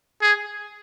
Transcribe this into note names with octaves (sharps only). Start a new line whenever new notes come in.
G#4